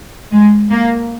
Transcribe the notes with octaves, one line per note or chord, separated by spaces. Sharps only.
G#3
A#3